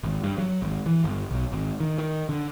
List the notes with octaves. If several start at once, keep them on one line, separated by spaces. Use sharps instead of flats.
G#1
G2
F#3
G#1
E3
G1
B1
G#1
D#3
D#3
D3